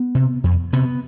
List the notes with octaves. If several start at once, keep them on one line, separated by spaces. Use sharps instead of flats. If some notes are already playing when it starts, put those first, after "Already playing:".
Already playing: B3
C3
F2
C3 B3